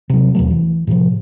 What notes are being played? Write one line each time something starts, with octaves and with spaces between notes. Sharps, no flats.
C3 F#3
D#2 B2 F#3 A3
E3
A2 C3 D#3 F3